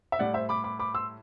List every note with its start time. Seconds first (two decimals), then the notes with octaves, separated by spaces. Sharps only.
0.12 E5
0.19 A2 G3 D5 F#5
0.34 C5 E5
0.49 B5 D6
0.64 B5 D6
0.79 B5 D6
0.94 C6 E6